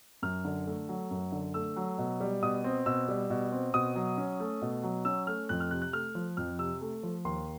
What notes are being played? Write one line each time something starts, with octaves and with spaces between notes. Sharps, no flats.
F#2 F6
D3
A3
F#3
F#2
D3
A3 E6
F#3
B2
G3
B2 D#6
C4
B2 E6
G3
B2
C4
B2 D#6
F#3
C#4
A3
B2
F#3
C#4 E6
A3 F6
F2 F#6
F6
C3 F#6
F#6
A3 F6
F3
F2 F6
C3 E6
A3
F3
D#2 C6